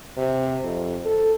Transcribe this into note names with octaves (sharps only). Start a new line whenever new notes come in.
C3
F2
A4